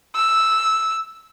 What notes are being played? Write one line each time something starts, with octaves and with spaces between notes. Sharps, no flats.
E6